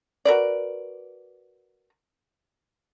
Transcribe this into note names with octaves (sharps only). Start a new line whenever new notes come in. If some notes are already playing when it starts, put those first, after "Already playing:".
F#4 A#4 B4 D5